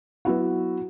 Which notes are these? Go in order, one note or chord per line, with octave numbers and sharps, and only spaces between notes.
F#3 B3 E4 F#4